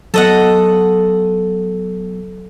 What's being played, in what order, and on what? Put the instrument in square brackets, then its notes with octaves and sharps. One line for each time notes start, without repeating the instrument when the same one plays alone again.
[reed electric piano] F#3 B3 [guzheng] A4 D#5 F#5